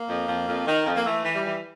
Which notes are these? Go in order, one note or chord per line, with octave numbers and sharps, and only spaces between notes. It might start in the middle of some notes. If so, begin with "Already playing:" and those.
Already playing: A#3
F2
F2
F2
D#3
F2
A#3
E3 A3
E3
G3
E3